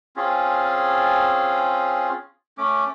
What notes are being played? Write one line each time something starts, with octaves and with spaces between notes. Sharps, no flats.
C4 C#4 F4 G#4
A3 C#4 D6